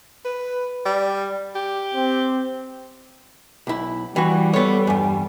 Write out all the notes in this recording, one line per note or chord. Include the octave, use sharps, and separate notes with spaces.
B4
G3
G4
C4
B1 E4
E3 G3 F#4 G5
B3 A4 C#5
E2 G2 G#5